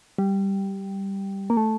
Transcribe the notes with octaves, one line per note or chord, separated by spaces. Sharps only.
G3
A#3
A3